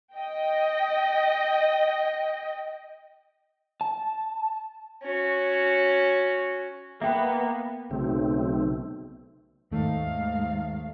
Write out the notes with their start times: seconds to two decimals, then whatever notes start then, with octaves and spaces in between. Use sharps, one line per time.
0.15 D#5 G5
3.81 A5
5.03 C#4 F#4
7.02 A#3 B3 E5 G5
7.91 B1 C#3 A3 C4
9.71 D#2 G#2 A3 F5